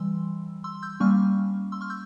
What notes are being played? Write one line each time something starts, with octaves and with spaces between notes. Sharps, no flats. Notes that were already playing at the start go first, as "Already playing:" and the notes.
Already playing: E3 G3 C6 E6
C6 E6
E6 G6
G3 A#3 C#4 C#6 F6
C6 E6
C#6 F6
E6 G6